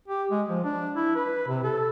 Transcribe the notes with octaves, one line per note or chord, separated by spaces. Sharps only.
G4
G#3
F3
D4
E4
B4
C3
A4